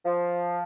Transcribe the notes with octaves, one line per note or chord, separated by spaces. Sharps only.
F3